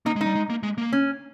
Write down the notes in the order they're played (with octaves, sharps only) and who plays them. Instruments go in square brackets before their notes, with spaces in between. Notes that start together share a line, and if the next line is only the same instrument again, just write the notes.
[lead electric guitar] A#3 [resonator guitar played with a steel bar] D#4
[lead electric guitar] G#3
[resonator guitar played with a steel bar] D#4
[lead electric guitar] G3
G#3
A#3
G#3
A#3
[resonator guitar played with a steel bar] C#4